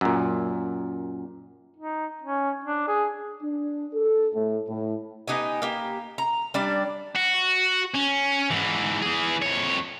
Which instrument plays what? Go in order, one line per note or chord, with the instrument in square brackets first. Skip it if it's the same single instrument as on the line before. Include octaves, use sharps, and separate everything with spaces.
[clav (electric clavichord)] F#2 A#2
[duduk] D#4
C#4
D4
G#4
[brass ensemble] D4
A4
A2
A2
[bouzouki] B3 D#4 G4 G#5
A#3 G4
A#5
G3 D4 D5
[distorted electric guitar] F#4
C#4
G#2 E3
E3 G#4
F2 C#5